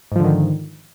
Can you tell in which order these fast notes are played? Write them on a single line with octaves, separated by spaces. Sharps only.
G#2 F3 D3 D#3